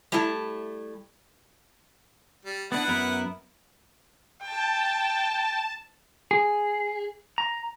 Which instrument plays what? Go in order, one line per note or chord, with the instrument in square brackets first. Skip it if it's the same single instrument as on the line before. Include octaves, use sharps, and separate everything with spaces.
[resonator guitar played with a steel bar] G3 A3 E4 A5
[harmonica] G3
[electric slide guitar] B3 D4 [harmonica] E4 B4 F#5
[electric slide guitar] F#2 B3 A#4
[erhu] G5 [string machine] A5
[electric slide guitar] G#4
A#5